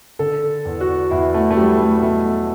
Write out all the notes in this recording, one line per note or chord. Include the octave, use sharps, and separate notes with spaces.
D3 A4
E2
F#4
E2 E4
A3
A3
F#3 G3
A3
B2 A3